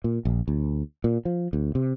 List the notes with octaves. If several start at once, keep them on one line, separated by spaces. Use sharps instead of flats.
A#2
A#1
D2
A#2
F3
D2
C3